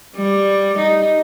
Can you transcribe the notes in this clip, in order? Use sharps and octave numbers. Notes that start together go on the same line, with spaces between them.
G3
D#4